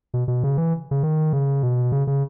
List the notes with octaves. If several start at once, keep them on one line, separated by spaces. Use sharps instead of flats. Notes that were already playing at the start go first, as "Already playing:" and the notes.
B2
B2
C#3
E3
C#3
D#3
C#3
B2
C#3
C#3